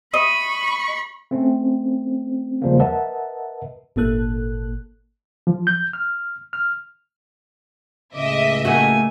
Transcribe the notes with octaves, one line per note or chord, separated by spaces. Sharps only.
D#5 B5 C#6
A3 C4 C#4
D#2 C#3 F3 G3 G#3 A#3
A#4 B4 D#5 E5 F#5 A5
G#1 A#2 A#3 A4 F#6
F3
G6
F6
F6
C#2 A2 C#3 D#5 E5 D6
A3 A#3 E4 F#4 G#5